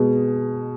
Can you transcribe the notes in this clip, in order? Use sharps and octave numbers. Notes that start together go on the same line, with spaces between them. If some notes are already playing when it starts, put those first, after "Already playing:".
Already playing: B2 G#3